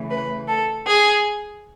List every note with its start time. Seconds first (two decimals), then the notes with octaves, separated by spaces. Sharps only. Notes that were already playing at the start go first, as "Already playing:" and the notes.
Already playing: C#3 E3 A3
0.11 B4
0.49 A4
0.87 G#4